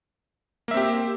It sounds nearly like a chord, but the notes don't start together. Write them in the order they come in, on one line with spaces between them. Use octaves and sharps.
A#3 E5 C4 G4